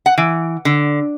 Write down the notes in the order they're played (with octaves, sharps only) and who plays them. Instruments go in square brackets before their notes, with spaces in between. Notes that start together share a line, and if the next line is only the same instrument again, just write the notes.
[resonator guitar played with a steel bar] F#5
E3
D3